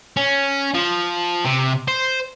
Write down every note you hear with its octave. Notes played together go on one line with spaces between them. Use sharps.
C#4
F3
C3
C5